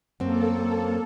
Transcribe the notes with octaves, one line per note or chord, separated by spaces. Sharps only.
F#2 A#3 C4 A4